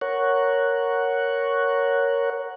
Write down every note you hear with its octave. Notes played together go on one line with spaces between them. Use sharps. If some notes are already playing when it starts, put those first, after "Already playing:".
A#4 C#5 F#5